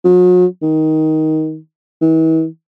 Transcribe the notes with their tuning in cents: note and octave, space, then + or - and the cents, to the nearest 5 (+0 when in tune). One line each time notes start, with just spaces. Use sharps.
F#3 -40
D#3 +10
E3 -40